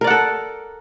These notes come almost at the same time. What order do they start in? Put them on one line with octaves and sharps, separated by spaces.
A#4 D5 F#5 A4